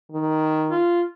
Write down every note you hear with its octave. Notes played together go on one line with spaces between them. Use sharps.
D#3
F4